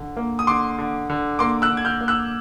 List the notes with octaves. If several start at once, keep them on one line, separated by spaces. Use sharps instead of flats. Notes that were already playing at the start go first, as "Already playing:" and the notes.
Already playing: D3
A#3
D#6
D3 C6 D6
D3
D3
A#3 C6 D6
E6 F#6
D3
G#6
F6 G6
A#3
E6 F#6